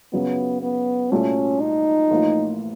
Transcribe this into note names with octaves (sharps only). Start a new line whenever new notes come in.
F#2 C#3 F#3 B3
B3
C2 A#2 F#3 A3 C#4
D#4
A1 A2 F3 A#3